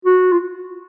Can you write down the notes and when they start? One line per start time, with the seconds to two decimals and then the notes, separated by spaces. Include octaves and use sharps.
0.05 F#4
0.32 F4